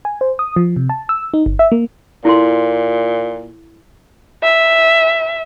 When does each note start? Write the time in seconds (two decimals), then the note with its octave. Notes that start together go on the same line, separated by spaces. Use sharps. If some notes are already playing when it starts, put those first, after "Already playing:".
0.05 G#5
0.21 C5
0.39 D#6
0.56 F3
0.76 C3
0.89 A5
1.09 E6
1.34 D#4
1.46 G1
1.59 E5
1.72 A#3
2.25 A#2 E4 A4 C6
4.43 E5